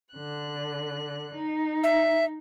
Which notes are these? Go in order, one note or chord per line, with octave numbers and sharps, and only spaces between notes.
D3 F#6
D#4
E5